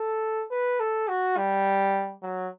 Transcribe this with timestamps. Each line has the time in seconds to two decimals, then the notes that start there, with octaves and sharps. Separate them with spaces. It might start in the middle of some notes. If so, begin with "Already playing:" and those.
Already playing: A4
0.51 B4
0.80 A4
1.08 F#4
1.37 G3
2.23 F#3